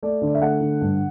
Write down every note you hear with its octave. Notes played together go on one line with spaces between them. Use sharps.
A3 D5
D3
D5
E5
A3 F#5
D3
G2